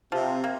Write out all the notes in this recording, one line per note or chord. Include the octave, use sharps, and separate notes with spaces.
C3 F3
A#3